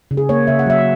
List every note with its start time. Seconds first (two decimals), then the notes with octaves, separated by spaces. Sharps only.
0.11 C#3
0.17 G#4
0.29 A#3 C#5
0.47 C#3 E5
0.59 F#5
0.66 F#3 E5